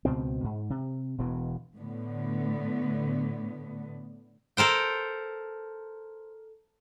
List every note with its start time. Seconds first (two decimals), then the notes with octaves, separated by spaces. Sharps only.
0.05 C#2 B2 C4
0.44 G#2
0.70 C3
1.18 E1 B2 E3
1.77 A2 D3 B3
4.57 A4 A#4 C5 G5